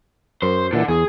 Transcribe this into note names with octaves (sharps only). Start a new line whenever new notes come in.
F#2 C5
A#2 D3 E3
E2 G#4